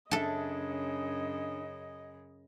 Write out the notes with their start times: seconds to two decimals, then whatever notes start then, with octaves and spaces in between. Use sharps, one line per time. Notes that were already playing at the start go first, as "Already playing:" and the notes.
0.11 F#2 C#3 D4 A4 D#5 E5 A5